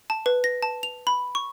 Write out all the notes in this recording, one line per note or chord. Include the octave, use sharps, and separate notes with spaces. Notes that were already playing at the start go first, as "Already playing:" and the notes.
A5
B4
A#6
A5
F7
B5
C#6